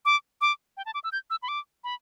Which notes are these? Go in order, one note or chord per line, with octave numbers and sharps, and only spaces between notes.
D6
D6
G5
A5
D6
E6
G6
E6
B5
D6
B5